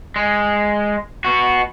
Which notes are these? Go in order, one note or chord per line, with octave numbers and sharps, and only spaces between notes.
G#3
B3 F#4